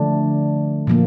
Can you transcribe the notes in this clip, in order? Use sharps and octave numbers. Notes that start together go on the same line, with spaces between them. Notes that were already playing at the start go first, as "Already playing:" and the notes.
Already playing: D3 F3 A3 D4
A#2 F3 A#3